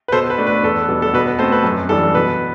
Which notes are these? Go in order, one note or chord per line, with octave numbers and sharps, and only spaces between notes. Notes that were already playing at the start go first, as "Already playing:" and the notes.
B4
B2 A4 C5
B4
A3 D4
B4
E2 A4
B2 G3 B3 D4
A4
B2 B4
B4
A3 C4 A4 C5
B4
F#2
E3 G3 D4 A4
B2 B4